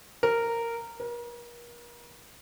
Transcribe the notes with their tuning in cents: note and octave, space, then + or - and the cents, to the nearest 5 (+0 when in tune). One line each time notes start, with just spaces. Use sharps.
A#4 -10
A#4 +40